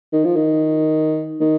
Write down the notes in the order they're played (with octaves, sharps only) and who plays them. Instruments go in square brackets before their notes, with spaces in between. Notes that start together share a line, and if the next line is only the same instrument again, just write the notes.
[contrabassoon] D#3
F3
D#3
D#3